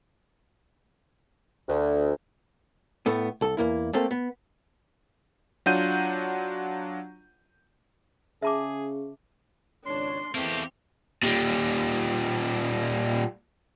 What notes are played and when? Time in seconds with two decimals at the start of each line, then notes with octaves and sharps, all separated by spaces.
1.68 D2
3.06 A2 A3 B3
3.41 C2 A4
3.57 E2 A#3 E4
3.93 A3 A#3 C4 A4
4.11 B3
5.66 F#3 D4 F4 F#5 G6 D#7
8.42 C#3 G#4 E5 A5 D6
9.86 G#1 C#2 D4 C#5 C6
10.35 E2 E3 A3 A#3 C4 G4
11.23 A#2 G3